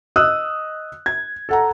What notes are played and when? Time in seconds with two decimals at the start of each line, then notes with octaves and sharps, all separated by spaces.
0.16 D#5 D#6 E6 F#6
1.06 G#6
1.49 A4 F#5 A#5